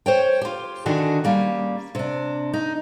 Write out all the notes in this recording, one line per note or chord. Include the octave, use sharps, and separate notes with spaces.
C5 C#5 G5
F4 G4
D3 D#3 D4 F#4 G#5
G3 A#3 C#4
C3 D4
D#4